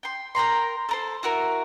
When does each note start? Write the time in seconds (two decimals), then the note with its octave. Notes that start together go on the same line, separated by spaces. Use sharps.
0.03 G5 C6
0.35 A#4 G5 A#5 C6
0.89 A4 A#4 C5
1.23 E4 F#4 A#4